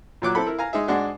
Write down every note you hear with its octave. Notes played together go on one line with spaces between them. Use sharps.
A#2 F#3 D6 F#6
C4 E4 A4 B5
E4 A#4
F5 G#5 A#5
G#3 D#4 G#4 E5
G#2 G#3 D4 F#4 G#4